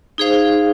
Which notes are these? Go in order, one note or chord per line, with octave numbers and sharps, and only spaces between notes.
D#4 G#4 C5 F5